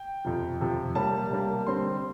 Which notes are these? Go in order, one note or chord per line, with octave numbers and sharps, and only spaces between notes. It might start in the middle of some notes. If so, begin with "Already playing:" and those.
Already playing: G5
F2 C3 F3
F2 C3 F3
C3 G3 A#3 A5
C3 G3 A#3
D3 G3 C4 C6